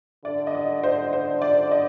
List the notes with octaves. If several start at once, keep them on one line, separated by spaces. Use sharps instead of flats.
D3 D5
D#5
D5
C5
C5
D5
D#5